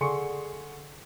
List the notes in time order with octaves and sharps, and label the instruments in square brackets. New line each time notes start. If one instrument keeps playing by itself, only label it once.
[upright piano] D3 G#4 C6 C#6 C#7